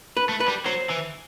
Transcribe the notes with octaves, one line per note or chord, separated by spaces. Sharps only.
B4
A3
B4
G3
F#3 C5
E3